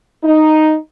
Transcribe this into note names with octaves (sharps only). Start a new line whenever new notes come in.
D#4